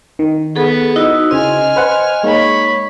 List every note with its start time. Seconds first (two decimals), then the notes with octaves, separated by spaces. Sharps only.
0.19 D#3
0.56 B3 G#4 A4
0.96 D#4 E4 F#4 D#5
1.31 C#3 C5 D#5 G#5 F6
1.76 B4 C5 F#5
2.23 G#3 A#3 D#4 C#5 B5